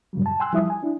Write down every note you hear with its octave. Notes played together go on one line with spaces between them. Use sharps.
F#2 A#2 C#3 F#3 G3
A5
G5 G#5 C6 E6 F#6
F3 G3 E4 E5 D#6
G#5
D4 E4